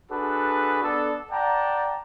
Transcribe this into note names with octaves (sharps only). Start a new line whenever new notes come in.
D4 F#4 G#4 A4 B4
B3 D4 A4
D5 F#5 G5 A5 A#5